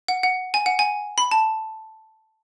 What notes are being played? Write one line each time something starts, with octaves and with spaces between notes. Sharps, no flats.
F#5
F#5
G#5
F#5
G#5
B5
A5